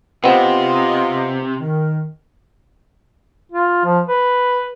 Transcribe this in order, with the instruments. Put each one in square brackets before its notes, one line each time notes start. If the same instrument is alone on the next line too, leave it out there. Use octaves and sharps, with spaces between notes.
[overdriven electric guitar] C3 [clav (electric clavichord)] B3 C4 [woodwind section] F4 D#5
[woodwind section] D#3
[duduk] F4
F3
B4